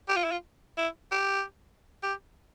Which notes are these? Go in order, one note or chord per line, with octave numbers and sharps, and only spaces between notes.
G4
F4
E4
F4
E4
G4
G4